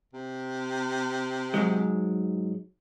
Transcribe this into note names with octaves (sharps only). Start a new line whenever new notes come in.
C3
G#2 F#3 G#3